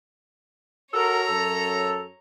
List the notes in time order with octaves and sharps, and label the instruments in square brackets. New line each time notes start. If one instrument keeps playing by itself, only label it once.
[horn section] F#4 A4 A#4 [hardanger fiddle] C#5 A#5
[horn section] F#2 A4